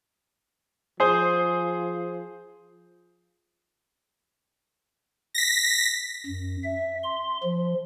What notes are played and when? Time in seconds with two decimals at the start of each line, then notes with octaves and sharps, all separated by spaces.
1.00 F3 G#4 C5
5.34 A#6 B6
6.26 F#2
6.63 E5
7.04 C6
7.43 F3